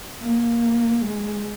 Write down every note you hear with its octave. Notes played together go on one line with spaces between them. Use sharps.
A#3
G#3